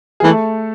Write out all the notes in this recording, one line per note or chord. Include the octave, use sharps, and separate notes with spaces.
G#4
E3 A3 A4